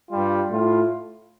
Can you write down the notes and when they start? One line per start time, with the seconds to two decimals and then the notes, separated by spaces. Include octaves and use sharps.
0.10 G2 G3 F4
0.50 A2 A3 F4